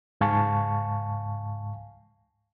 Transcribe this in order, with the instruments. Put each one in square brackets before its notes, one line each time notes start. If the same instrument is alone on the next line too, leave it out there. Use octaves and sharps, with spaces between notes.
[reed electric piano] C#2 G#2 F5 G#5 A5 C#6